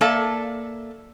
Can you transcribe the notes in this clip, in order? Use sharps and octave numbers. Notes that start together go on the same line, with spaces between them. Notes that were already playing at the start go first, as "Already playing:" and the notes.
A#3 A4 D5 E5 A5